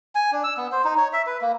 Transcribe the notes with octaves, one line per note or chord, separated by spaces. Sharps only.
G#5
D4
E6
B3
C5
D#4
C#5
E5
B4
A#3